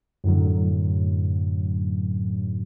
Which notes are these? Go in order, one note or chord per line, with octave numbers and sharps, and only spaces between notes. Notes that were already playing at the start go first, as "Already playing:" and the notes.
F#2 A2 D3 F#3